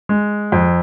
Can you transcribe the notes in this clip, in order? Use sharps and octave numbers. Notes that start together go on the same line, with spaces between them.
G#3
F2